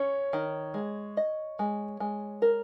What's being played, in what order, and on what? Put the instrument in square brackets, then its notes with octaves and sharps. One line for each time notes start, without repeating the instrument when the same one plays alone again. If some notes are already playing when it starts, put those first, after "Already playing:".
Already playing: [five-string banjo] C#4 [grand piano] C#5
[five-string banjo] D#3
G#3
D#5
G#3
G#3
A#4